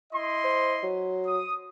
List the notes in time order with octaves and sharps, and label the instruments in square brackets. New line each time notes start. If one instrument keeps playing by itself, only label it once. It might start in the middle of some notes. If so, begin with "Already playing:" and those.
[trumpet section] E4 D#5 C6
[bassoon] C5
F#3
[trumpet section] D#6